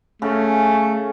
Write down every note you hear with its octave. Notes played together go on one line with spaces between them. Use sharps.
C#3 A3 C#4